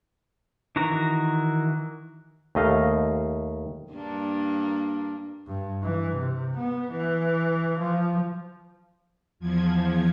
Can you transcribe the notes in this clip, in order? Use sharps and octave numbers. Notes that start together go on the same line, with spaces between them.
D#3 E3 F#4 A#5
D#2 A3 D#5 F5
G2 A#3 D4
G2
E3
C3
B3
E3
F3
E2 F3 G#6